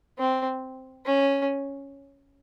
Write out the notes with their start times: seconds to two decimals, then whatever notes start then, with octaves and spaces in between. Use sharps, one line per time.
0.18 C4
1.05 C#4